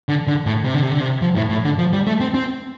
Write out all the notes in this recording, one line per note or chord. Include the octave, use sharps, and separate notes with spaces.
D3
D3
A2
C3
D3
C3
D3
C3
F3
A2
A2
D3
F3
G3
A3
C4
C4